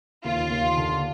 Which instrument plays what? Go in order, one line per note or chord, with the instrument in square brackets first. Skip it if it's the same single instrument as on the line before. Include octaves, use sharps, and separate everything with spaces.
[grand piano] D#2 [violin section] F4
[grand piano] D#2
D3